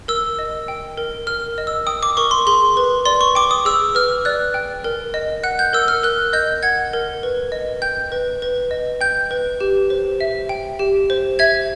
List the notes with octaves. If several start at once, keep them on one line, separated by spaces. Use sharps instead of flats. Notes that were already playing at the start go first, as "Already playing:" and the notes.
A#4 E6
D#5
G5
A#4
A#4 F6
D#5
E6
G5 D#6
D6
A#4 C#6
C6
G#4 C6
B4
D5 C6
C#6
G5 D6
D#6
G#4 E6
B4 F6
D5 F#6
G5
A#4
D#5
F#5 F#6
G6
A#4 E6
F6
A#4 F#6
D#5 G6
F#5 G#6
A#4
B4
D#5
G5 G6
B4
B4
D#5
G5 G6
B4
G4
C5
E5
G5
G4
C5
E5 G#6